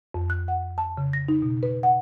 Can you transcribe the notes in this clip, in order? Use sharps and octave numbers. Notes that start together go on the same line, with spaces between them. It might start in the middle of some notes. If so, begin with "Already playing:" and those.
F2
F#6
F#5
A5
C#3
A#6
D#4
B2
B4
F#5